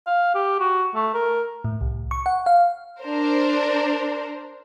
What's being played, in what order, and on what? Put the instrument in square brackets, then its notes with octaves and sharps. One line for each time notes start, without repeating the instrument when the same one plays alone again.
[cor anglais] F5
G4
F#4
A3
A#4
[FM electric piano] A2
C2
C#6
F#5
F5
[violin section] D4 A#4 C5